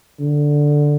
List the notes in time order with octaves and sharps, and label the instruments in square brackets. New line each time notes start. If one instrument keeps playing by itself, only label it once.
[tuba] D3